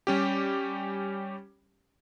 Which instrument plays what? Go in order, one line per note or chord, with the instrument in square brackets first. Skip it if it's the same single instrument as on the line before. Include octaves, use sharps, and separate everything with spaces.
[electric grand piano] G3 C#4 G4